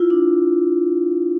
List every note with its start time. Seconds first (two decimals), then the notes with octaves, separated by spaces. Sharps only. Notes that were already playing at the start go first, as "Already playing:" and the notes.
Already playing: E4 F4
0.10 D4